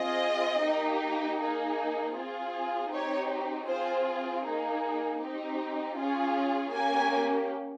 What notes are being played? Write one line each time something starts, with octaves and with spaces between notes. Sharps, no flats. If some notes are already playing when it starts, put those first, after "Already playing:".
Already playing: C4 F4 G#4 D#5
A#3 D#4 G4
A#3 D#4 G#4
C4 F4 G#4
C4 D#4 G4 C#5
C4 F4 G#4 C5
A#3 D#4 G#4
C4 D#4 G4
C#4 F4 G#4
A#3 C#4 G4 G#5